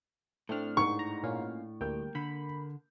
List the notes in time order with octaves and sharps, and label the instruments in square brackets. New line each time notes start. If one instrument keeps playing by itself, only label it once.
[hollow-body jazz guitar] A2 D4 [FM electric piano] A3 C4 F6
[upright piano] G#2 [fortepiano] C#6
[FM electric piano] A#5
A#2 C#4 F5
[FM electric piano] D2 G3 G5 [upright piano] A#3 G6
[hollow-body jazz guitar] D3 [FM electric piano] B5